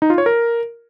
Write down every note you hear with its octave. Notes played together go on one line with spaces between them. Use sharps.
D#4
F4
C#5
A#4